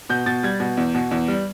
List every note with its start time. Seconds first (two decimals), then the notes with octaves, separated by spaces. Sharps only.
0.10 B2 G6
0.26 B2 A6
0.43 G3 G#6
0.60 B2
0.77 E2
0.94 B2
1.11 E2
1.28 G3